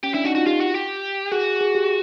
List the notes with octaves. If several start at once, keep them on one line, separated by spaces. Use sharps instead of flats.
C#4 G4
D4 E4
D#4 F#4
F4 F#4
F4 G4
F#4
G4
F#4 G#4
G#4
G4